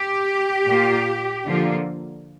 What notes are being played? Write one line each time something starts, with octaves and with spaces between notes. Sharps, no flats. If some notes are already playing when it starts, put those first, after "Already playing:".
Already playing: G4
A#2 A#3 F4
D3 F3 A#3 F4